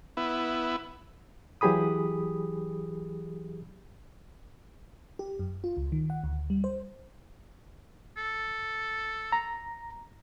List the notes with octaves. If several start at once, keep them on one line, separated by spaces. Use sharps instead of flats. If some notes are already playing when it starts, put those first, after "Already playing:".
B3 E4
E3 F#3 G4 G#4 B5 D#6
G4
F#2
F4
C#2
D#3
F#5
D2
G3
C5
A4
A#5